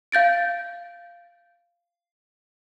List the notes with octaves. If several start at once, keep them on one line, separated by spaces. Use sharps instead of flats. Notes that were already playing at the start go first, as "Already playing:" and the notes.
F5 G6 A6 D7